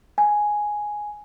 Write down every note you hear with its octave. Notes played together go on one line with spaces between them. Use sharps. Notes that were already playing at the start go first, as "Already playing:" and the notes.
G#5